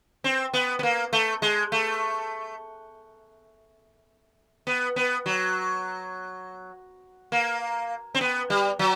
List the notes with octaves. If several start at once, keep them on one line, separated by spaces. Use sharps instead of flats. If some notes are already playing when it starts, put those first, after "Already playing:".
C4
B3
B3
A#3
A3
G#3
A3
B3
B3
F#3
A#3
C4
B3
G3
F#3